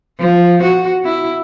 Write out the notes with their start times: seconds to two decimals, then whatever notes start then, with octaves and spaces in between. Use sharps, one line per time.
0.19 F3
0.63 F#4
1.04 E4